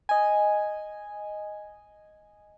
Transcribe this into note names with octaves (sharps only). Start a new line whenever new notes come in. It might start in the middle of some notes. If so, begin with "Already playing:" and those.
D#5 G#5